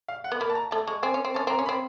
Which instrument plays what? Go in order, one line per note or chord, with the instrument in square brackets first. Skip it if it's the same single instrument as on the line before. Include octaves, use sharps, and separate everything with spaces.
[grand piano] F5
F#5
[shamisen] B3
[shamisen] A#3 [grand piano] B5
[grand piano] A5
A#5
[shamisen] A3 [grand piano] A5
[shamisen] G#3 [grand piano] C#6
[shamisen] C4 [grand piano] G#5
[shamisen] C#4
C4
[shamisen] C#4 [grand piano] A5
[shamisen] C4 [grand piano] A#5
[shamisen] C#4
[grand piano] B5
[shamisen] C4